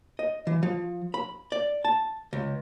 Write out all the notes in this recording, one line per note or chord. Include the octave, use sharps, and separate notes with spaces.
D#5
E3
F3
B5
D5
A5
C#2